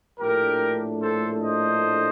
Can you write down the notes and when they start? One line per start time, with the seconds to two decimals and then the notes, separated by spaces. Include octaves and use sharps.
0.20 A#1 A2 A3 D4 G4 A#4
1.01 A4 C5
1.42 C5 D#5